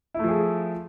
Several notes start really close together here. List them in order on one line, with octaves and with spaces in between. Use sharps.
E4 A3 F3 G#4